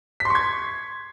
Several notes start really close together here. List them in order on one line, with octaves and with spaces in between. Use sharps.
B6 C6 C#6 G#6